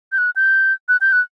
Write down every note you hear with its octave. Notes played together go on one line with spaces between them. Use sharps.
G6
F#6
G6
F#6
G6
F#6